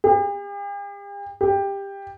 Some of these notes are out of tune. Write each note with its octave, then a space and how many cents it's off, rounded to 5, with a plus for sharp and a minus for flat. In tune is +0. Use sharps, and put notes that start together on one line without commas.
G4 +45
G4 +15